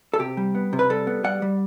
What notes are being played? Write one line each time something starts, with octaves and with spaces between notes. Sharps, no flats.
A4
C3 G4
G3
B3
C3
B4
G3 A4
B3
G3 F#5
G3